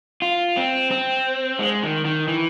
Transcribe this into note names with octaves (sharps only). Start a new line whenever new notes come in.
F4
C4
C4
G#3
D#3
D#3
E3